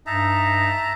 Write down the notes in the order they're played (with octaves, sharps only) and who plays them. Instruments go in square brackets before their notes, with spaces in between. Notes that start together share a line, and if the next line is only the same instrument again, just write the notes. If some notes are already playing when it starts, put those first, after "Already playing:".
[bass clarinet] G2 [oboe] D#4 [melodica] E5 A5 A#5